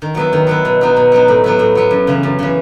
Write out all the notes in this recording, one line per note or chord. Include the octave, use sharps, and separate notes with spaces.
D#3
F#3 B3 E4
D#3
F#3 B3 E4
B2
F#3 B3 D#4
B2
F#3 B3 D#4
A2
F#3 B3 E4
A2
F#3 B3 E4
F#2
C#3 E3
F#2
C#3 E3